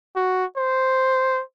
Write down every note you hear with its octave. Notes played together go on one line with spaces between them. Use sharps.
F#4
C5